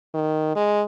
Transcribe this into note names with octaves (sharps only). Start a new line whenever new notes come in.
D#3
G#3